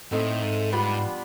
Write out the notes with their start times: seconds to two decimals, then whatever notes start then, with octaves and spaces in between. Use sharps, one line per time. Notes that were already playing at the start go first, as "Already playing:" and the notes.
0.11 A2 A3 C4 D#4
0.42 G#2
0.72 G3 B3 D4 F4